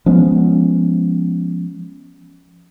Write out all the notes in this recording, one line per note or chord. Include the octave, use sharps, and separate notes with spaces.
F3 G#3 B3 C#4